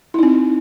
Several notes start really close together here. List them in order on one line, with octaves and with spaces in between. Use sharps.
E4 D#4 C4